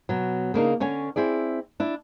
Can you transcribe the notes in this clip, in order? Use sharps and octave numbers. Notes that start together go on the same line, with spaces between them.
B2 F#3
C#3 A#3 D4 D#4
D3 C#4 C#5 G#5
C4 E4 G#4 D5
D4 E4